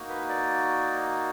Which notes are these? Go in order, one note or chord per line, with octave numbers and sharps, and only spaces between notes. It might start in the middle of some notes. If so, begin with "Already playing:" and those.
Already playing: A#3 D#4 F#4
B4
D5